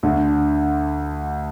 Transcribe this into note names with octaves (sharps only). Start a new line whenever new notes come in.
D2 D3